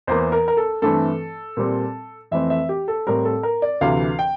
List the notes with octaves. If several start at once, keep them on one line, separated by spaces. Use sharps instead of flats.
E2 E3 A#3 C5
A#4
A#4
A4
G2 E3 A3 C4 A4
A#2 G3 C4
F2 E3 A3 C4 E5
E5
G4
A4
A2 G3 C4 A#4
A4
A#4
D5
D2 C3 E3 F5
G5